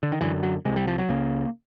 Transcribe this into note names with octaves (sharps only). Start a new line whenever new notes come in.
D3
D#3
F#2 D3 E3
F#3
C2 C3 G#3
G3
F3
F#3
C#2 C#3 A#3